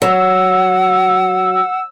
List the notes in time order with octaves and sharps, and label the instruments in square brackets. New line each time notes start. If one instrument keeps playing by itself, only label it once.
[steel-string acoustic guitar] F#3 [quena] F#5 [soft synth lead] E6